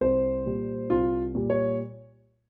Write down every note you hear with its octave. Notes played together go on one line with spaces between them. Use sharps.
C2 C5
A#2 G3
C2 F4
A#2 G3
C#5